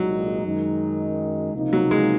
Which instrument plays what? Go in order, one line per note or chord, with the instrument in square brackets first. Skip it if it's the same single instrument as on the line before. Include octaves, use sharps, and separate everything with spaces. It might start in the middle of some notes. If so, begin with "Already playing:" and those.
Already playing: [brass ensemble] C2 A#2 G#3 D#4 [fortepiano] F#3
[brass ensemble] F#2 D#3 G#3 D#4
C#2 C3 F3 A#3 D#4
[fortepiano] F#3
G#3